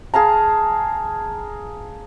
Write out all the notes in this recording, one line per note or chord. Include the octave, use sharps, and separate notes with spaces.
G#4 F5 A5 A#5